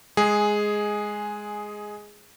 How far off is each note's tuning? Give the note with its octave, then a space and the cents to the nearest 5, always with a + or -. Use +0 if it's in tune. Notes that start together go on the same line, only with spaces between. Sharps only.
G#3 +5 G#4 +0